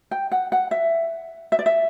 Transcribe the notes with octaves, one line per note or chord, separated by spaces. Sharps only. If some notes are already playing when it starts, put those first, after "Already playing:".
G5
F#5
F#5
E5
E5
D5
E5